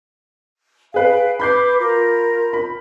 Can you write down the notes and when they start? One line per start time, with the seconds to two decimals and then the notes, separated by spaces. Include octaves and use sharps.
0.94 G#4 B4 F5 G5
1.40 B4 B5 D6 G6 C7
1.78 F4 A#4
2.53 B5